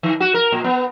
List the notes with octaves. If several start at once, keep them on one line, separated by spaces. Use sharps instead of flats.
D#3
F#4
A#4
A#2
B3